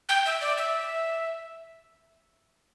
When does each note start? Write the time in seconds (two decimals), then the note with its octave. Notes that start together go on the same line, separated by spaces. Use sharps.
0.09 G5
0.26 E5
0.41 D5
0.58 E5